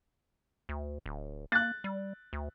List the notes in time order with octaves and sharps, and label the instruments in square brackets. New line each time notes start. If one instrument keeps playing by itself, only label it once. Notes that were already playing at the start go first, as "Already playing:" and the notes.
[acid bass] D2
D1
[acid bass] A#3 [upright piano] F#6 A6
[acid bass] G3
D2